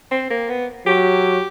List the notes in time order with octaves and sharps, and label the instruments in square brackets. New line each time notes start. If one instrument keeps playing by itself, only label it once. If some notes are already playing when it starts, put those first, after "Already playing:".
[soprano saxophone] C4
A#3
B3
[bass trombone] F#3 [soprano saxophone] G4